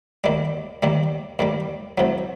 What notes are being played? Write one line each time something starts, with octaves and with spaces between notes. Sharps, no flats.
D#2 D#3 G3
D#2 D#3 G3
D#2 D#3 G3
C2 C3 F#3